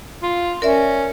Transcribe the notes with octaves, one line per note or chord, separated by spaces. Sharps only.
F4
C#4 A#4 D5 E5